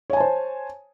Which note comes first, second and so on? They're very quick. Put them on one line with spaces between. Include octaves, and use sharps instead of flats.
C#5 G#5 A5 C5